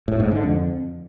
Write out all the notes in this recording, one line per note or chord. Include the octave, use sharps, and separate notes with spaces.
A2
G#2
D3
F2